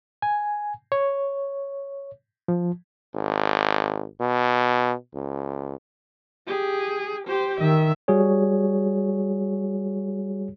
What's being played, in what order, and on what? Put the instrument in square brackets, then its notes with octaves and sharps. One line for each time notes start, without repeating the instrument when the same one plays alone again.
[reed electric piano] G#5
C#5
F3
[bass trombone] G#1
B2
C#2
[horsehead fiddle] G4 G#4
G4 C5
[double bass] D#3 [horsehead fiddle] E5
[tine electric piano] G3 F#4 G#4 C#5